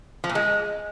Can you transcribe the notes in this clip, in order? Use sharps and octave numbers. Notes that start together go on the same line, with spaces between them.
F3
A#2
G#3